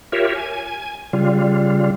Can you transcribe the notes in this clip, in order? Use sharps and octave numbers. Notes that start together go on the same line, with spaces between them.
F4 G4 A#4 C#5 E5
G#5
C#3 G3 F4